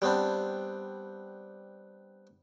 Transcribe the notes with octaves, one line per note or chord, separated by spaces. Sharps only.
G3 B3 C4 D4